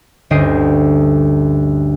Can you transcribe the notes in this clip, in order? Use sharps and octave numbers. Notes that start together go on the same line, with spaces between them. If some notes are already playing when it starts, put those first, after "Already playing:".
G1 D2 C#4 D#5 G5 C7